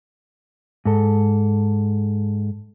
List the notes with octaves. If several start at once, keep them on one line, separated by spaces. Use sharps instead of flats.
G#2 A4